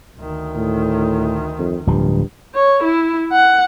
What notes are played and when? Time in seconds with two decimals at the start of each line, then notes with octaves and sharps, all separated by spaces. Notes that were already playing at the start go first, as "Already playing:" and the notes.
0.18 D2 D#3
0.55 A2
1.59 F2
1.87 D1 G2 F3
2.55 C#5
2.84 E4
3.32 F#5